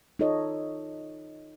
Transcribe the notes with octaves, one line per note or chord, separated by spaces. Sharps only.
D#4 F4 A4 C#5 D#5